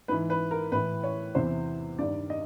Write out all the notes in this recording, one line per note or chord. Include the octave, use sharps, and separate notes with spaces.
G#2 E3 B4
B4
A#4
A2 E3 B4
C#5
E2 C3 E3 C5
G2 D#3 D5
D#5